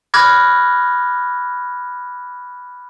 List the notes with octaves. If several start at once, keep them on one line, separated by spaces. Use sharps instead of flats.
B5 D6 F6 F#6 G#6 A#6